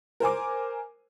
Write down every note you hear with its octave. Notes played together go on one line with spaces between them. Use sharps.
A#4 C5 G#5 D6